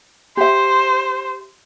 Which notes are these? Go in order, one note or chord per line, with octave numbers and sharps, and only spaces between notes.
G4 C5 E5